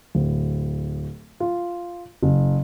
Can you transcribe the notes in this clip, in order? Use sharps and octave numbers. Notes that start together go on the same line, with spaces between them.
D1
F4
F#1